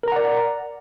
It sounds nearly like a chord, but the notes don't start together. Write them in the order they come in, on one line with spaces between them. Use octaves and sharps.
A#4 A#5 F#5 D5